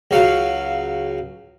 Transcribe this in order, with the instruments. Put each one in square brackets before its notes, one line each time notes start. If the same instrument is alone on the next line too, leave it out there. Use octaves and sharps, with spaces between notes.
[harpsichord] C#2 C#3 F#3 F5